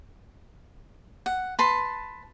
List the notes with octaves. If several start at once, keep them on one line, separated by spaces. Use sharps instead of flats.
F#5
B4 A5 C6